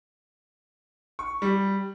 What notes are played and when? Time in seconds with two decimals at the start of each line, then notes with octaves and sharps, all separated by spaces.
1.19 C#6
1.42 G3